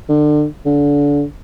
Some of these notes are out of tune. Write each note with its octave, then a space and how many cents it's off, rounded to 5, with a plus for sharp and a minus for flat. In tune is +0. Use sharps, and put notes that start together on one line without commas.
D3 +30
D3 -30